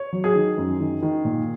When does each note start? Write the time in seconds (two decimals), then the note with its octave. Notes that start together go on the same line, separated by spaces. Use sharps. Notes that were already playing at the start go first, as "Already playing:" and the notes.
Already playing: C#5
0.13 F#3
0.24 G#4
0.35 D#3
0.58 F#2
0.80 D#3
1.02 D#3
1.25 A#2